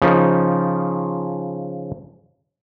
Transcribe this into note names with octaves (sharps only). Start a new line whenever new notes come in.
C#3 F3 D#4